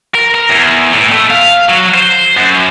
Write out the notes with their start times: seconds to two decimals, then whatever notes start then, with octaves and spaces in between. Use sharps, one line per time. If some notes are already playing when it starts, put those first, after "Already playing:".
0.15 A#4
0.35 A#4
0.49 E2
0.92 A2
1.12 A3
1.30 F5
1.68 F#3
1.94 C5
2.37 F#2